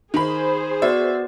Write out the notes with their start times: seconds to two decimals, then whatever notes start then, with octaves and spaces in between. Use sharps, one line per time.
0.14 D#3 G#4 C5 B5
0.82 B3 F#4 D5 E5